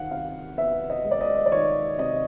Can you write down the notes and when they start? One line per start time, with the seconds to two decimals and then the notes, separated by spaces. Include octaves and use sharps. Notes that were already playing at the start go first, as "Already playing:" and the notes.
Already playing: D#3 F5 F#5
0.11 C3 F5
0.58 B3 E5
0.90 D#5
1.05 G#3
1.11 D5
1.21 D#5
1.46 D5
1.52 D#3 C#5
1.98 C3 D#5